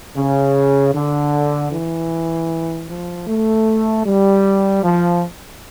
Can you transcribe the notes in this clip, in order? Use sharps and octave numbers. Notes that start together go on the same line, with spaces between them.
C#3
D3
E3
F3
A3
G3
F3